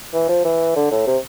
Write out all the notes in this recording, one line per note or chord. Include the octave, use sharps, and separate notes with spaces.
E3
F3
E3
D3
A2
C3